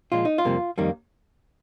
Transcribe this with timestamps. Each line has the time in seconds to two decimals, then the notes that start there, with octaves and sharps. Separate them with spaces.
0.12 A#2 F3 G#3 F4
0.25 D#4
0.38 F4
0.45 F2 C3 G3 A#3
0.78 F2 D#3 G3 A#3